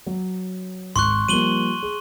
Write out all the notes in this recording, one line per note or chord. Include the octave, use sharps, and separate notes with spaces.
F#3
G#1 C6 C#6 F#6
F3 G3 A#3 D#7 F#7 G7
G#4